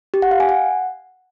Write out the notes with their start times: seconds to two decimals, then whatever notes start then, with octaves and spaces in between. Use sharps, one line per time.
0.14 G4
0.22 F#5
0.31 F5
0.40 G#5
0.49 F#5